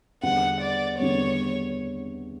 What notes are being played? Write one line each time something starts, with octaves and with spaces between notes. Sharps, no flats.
E2 D3 G3 B3 F#5
D5
E2 D3 G3 B3 C#5